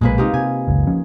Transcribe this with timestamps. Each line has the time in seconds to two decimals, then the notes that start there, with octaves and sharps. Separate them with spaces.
0.01 B1 A#2 G#3 A#3 B4
0.18 C3 D#4 F4 G4
0.34 C3 G#5
0.68 F#1 C#2
0.87 F3 C#4